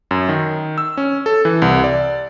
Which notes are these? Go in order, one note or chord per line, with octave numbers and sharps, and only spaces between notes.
F#2
D#3
E6
C#4
A4
E3
C2
D5